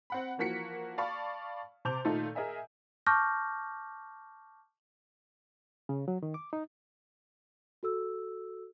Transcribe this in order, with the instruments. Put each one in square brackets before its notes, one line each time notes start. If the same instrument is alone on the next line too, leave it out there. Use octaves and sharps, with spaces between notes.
[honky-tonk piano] C4 F#5 B5
E3 F3 A#3 F#4 B6 C#7
D5 F5 A5 B5 C#6
C3 C5 A5 D6 G6 F7
A#2 D#3 A3 D#4 F4 A4
G#4 A#4 D#5 E5 G#5
[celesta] A5 C#6 D6 F6 G6 A#6
[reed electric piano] C#3
F#3
D#3
D6
D#4
[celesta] F#4 A4 E6